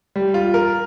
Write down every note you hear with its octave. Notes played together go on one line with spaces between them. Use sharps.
G3
F4
A#4